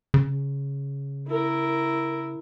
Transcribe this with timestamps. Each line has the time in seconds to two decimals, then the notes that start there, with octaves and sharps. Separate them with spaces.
0.14 C#3
1.28 E4 A#4